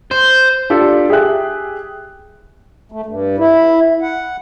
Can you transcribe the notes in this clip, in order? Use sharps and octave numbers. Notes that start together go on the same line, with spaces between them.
C5
D4 F4 G4 A4 D5
G4 G#4 E5 G5 F#6
A3
G2
E4
F#5